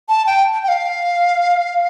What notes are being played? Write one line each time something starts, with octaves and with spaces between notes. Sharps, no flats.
A5
G5
G5
F5